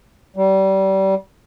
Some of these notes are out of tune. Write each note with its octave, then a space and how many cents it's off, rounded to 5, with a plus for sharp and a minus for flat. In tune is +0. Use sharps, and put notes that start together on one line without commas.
G3 -25